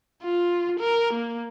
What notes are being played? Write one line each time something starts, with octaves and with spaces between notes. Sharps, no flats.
F4
A#4
A#3